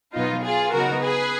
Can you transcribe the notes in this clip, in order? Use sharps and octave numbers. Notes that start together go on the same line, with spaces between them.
B2 F#3 B3 D#4 F4
F4 G#4
C#3 F#3 B3 D#4 F#4 A#4
G#4 B4